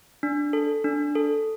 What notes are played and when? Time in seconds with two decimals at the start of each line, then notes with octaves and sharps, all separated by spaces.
0.23 D4
0.53 A4
0.84 D4
1.15 A4